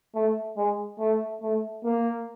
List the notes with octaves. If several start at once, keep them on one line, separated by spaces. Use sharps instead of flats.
A3
G#3
A3
A3
A#3